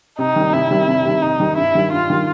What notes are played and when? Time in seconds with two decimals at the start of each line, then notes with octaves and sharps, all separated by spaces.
0.19 C3 D#4
0.36 D#3 G3
0.53 C3 E4
0.71 D#3 G3
0.88 C3
1.06 D#3 G3
1.23 C3 D#4
1.40 D#3 G3
1.57 G2 E4
1.75 D#3 G3
1.92 G2 F4
2.10 D#3 G3